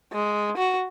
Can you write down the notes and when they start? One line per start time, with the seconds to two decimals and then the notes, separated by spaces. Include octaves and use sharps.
0.13 G#3
0.57 F#4